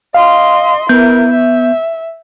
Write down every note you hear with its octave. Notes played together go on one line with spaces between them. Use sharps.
D#5 F5 C6
B3 E4 A#4 G6
E5